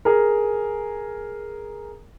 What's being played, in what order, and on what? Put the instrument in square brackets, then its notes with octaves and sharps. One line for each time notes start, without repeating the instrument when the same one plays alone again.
[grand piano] G#4 A#4